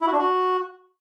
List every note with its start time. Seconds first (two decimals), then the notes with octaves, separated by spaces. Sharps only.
0.01 E4
0.07 F#4
0.13 D4
0.18 F#4